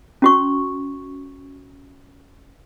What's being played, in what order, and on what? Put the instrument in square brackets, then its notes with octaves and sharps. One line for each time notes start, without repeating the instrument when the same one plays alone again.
[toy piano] C#4 F#4 C#6